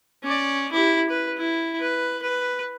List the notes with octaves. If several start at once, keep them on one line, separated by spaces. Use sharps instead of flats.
C#4 D5
E4 G4
B4
E4
B4
B4